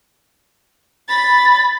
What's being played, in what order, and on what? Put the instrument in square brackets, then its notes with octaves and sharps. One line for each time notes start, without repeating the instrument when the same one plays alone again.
[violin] B5 A6